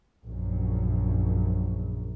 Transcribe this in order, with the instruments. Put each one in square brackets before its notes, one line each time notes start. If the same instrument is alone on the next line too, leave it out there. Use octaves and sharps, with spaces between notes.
[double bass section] A#1 F#2